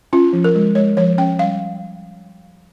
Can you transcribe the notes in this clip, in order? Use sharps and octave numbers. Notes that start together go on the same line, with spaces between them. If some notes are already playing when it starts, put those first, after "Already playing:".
C#4 F4
F3
A#4
G#3
G#3 C#5
F3 C#5
C#4 G5
G3 F5